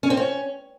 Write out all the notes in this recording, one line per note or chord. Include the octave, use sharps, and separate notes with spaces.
C#4
C4
C#4